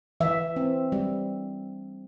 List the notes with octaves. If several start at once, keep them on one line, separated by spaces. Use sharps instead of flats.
E3 E5
C4
G3